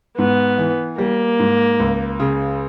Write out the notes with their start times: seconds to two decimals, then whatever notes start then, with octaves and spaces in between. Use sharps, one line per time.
0.18 G#2 B3
0.58 E3
0.98 G3 A#3
1.39 G#2
1.80 C#2
2.20 C#3